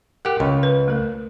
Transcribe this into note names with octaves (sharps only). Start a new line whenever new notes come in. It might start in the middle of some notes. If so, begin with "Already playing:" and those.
G4 A#4 F#5
C#2
B4
A3 A#4